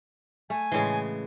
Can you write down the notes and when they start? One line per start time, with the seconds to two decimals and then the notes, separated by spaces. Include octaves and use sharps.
0.50 A3 G#5
0.72 A2 C#3 E3 G#3 C6